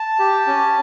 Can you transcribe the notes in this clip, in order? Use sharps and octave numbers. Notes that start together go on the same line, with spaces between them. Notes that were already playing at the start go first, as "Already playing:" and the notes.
Already playing: A5
G4
C#4